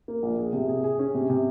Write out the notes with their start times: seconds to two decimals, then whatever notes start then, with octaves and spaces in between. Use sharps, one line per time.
0.08 A#3
0.23 A#1
0.38 G#4
0.53 C3
0.69 G#4
0.84 G#4
0.99 C#4
1.14 C3
1.30 C3